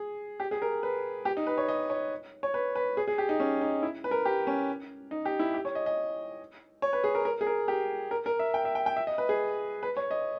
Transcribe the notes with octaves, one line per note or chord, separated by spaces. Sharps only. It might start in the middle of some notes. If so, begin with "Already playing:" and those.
Already playing: G#4
G4
G#4
A#4
B4
G4
D#4
B4
C#5
D#5
C#5
C#5
B4
B4
G#4
G#4
G4
D#4
C#4
D#4
E4
B4
A#4
G4
C#4
D#4
G4
E4
G4
C#5
D#5
D#5
C#5
B4
G#4
A#4
A#4
G#4
A#4
G4
A#4
A#4
E5
G5
E5
G5
G5
E5
D#5
B4
G#4
B4
C#5
D#5